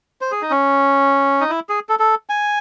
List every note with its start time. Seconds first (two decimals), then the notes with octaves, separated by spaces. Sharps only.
0.21 C5
0.32 G#4
0.42 D#4
0.50 C#4
1.41 D#4
1.49 E4
1.69 G#4
1.89 A4
1.99 A4
2.29 G#5